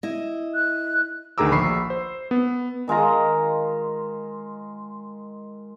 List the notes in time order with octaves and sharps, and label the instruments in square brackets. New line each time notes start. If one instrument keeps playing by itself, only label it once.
[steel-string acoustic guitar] E4 D#5
[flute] F#6
[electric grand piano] D2 D#3 G#4 A#5 D6 E6
A#1 B5 C#6 C7
C5
B3
[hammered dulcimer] D#3 G#3 F4 A#5